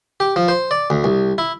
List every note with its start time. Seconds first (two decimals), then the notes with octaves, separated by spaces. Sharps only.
0.20 G4
0.36 F3
0.48 C5
0.71 D5
0.90 D2
1.04 C2
1.38 E4